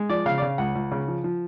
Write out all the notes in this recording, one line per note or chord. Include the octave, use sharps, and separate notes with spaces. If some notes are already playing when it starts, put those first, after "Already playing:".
Already playing: G#3
F3 D5
C#3 F5
D5
C#3 F5
C#2 F#5
C#2
C#3
F3
F3